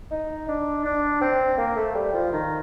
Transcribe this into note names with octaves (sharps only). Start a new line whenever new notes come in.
D#4
D4
D4
C4
A#3
A3
G3
F3
D#3